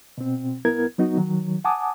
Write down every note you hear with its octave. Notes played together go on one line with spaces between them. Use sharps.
B2 C4
C2 B3 E4 A#4 G#6
F#3 B3 D#4 F#4
D#3 F#3
F#5 G#5 A5 D6 D#6